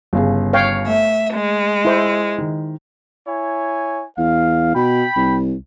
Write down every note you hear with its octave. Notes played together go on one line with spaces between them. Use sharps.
G1 C#3 G#4
C#5 F5 G5
A3 E5
G#3
E4 C5
D#3
E4 C#5 G#5
E2 F5
B2 G5 B5
C2